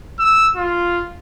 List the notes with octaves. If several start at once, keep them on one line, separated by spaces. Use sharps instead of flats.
E6
F4